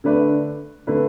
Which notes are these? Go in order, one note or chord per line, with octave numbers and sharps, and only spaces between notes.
D3 A3 D4 B4 D5
D3 A3 D4 B4 D5